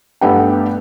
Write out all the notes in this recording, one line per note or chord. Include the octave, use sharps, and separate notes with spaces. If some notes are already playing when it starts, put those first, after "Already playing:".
G2 A3 B3 G4 F#5 G5